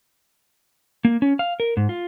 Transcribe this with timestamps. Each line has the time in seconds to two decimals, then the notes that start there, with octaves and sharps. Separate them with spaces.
1.05 A#3
1.22 C#4
1.39 F5
1.60 A#4
1.77 G#2
1.89 F4